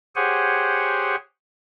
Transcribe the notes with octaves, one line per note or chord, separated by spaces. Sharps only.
G4 G#4 C5 C#5 F#5 G#5